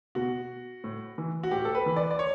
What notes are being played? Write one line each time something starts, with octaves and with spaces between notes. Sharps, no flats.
B2 F#4
A2
E3
F#4
A2 G4
A4
B4
E3
D5
D5
C#5